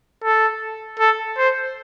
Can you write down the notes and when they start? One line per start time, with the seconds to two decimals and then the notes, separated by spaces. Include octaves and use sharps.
0.24 A4
0.99 A4
1.38 C5